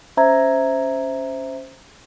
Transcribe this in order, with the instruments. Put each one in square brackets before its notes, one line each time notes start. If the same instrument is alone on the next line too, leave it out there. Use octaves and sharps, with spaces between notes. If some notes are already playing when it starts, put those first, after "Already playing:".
[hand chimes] C#4 C5 E5 A#5 G#6